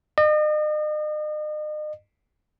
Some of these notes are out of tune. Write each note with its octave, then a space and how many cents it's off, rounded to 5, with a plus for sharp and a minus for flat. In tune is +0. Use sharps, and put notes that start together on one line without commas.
D#5 -40